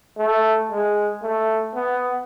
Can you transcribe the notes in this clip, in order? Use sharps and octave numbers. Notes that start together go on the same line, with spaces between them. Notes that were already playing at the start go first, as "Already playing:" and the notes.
A3
G#3
A3
B3